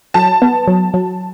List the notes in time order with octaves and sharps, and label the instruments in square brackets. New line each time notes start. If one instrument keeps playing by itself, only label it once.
[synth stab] F#3 [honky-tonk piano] A5
[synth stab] B3
F#3
F#3